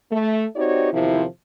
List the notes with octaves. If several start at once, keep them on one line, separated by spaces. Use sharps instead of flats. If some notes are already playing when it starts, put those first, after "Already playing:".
A3
C4 D#4 F#4 G4 C#5 D5
E2 C3 D#3 F3 E4